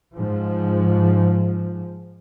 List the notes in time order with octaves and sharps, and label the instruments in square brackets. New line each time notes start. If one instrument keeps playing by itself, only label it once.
[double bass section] G#2 F3